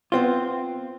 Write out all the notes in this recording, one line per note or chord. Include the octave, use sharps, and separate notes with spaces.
B3 C4 F4